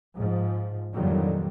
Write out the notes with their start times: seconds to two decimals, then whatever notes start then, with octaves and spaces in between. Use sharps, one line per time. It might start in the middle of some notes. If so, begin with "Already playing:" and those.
0.16 G#2 F3
0.94 F2 A#2 D3 D#3 F#3 G3